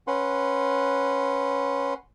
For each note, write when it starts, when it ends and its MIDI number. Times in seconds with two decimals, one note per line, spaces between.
0.07 1.94 61
0.07 1.94 71
0.07 1.94 78
0.07 1.94 84